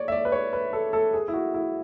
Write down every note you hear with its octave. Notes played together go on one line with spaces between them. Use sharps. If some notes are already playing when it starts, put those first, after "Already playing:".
Already playing: C#5 D5
E5
D5
B4
C#5
B4
A4
A4
G#4
E4
F#4
E4